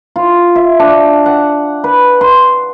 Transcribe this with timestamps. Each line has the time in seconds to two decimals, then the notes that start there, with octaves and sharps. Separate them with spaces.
0.16 F4
0.55 E5
0.79 D4
1.26 F#5
1.84 B4
2.21 C6